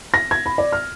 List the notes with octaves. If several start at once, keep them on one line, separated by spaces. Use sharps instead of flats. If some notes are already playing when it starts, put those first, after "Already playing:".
A#6
G#6
B5
D5
F6